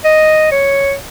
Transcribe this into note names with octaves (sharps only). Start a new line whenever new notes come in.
D#5
C#5